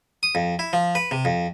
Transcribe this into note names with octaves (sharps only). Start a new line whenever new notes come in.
D#6
F2
E4
F3
B4
C3
F2